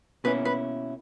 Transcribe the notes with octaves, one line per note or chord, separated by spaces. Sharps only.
B2 A#3 C#4 E4 B4
B4